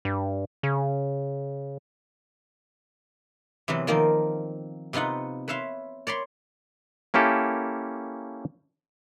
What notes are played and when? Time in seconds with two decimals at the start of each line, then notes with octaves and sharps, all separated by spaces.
0.05 G2
0.63 C#3
3.68 C3 E3 F#3 B3
3.87 D#3 F3 A#3 C4 D#4
4.93 C3 B3 D#4 F4 F#5
5.48 B4 C#5 E5 F5 C6
6.07 C#5 D5 B5 C6
7.14 A#3 C#4 E4 G4 A4